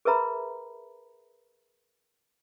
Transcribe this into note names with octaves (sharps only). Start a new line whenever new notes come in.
G#4 A#4 B4 E5 A#5 B5